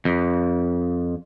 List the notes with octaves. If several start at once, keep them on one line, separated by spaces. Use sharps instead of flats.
F2